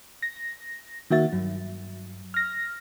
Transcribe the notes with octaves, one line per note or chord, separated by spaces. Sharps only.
A#6
D#3 A#3 F#4 E5 A6
G2 F#3
F6 A#6